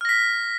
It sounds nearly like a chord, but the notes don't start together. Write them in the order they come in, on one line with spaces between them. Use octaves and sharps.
F6 A#6 B6